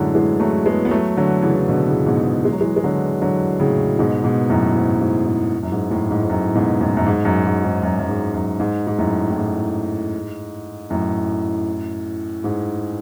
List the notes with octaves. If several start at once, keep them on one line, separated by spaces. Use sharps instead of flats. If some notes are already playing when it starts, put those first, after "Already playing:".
Already playing: F#2 A2 D3 F#3 G#3
E3 G#3
F#3 A3
G#3 B3
B3
F#3 A3
D3 F#3
C#3 E3
E3
B2 D3
A2 C#3
G#2 B2
G#3
F#3
E3 G#3
G#3
D3 F#3
D3 F#3
A2 C#3
G#2 B2
G#2 B2
F#2 A2
G#2
G#2
G#2
F#2
G#2
F#2 A2
G#2
G#2
F#2 A2
G#2 B2
F#2 A2
F#2
G#2
F#2
G#2
G#2
F#2
F#2
G#2
F#2
G#2
G#2
F#2 A2
A2
G#2
F#2 A2
G#2